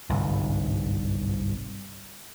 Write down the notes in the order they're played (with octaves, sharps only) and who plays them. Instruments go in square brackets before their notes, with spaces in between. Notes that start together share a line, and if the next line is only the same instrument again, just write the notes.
[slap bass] G1 C2 G#2